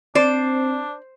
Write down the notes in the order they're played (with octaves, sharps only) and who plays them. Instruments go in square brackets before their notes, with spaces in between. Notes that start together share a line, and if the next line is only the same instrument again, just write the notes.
[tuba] C4 [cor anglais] D4 [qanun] C5 [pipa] D5